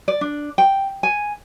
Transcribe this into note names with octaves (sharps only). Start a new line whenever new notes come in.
D5
D4
G5
G#5